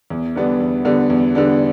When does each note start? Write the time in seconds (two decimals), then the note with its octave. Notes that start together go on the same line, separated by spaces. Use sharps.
0.10 E2
0.36 D3 G3 B3 D4
0.60 E2
0.85 D3 G3 B3 D4
1.10 E2
1.35 D3 G3 B3 D4